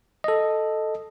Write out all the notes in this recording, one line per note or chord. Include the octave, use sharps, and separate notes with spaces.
A4 D#5